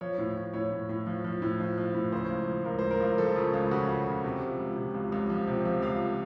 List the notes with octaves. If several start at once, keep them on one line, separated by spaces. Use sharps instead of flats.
F3 C#5
A2
A2
A2 C#5
A2
A2
F3
F3
A2
F3
F3
A2
C#3 C5
C#2
F3
C#2 A#4
C#2 C5
A#4
C#2
F3 A4
C#3
C#2
C#3 F#4
C#3
C#3
C3
F3
C#2
C3
C#2
C#2
F3
C3
F3
C#2 F5